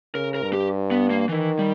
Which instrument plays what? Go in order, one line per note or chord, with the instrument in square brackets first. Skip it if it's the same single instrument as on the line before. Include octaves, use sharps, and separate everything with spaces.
[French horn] C#3 [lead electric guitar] A#4
[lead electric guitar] A#4
[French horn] G2
[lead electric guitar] G4
B3
A#3
[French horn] D#3 [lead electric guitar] E3
[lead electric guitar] G3